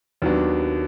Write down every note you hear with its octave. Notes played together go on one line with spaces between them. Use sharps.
D#2 D#3 F#3 B3 D4